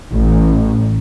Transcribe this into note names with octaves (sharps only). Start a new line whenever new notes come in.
A1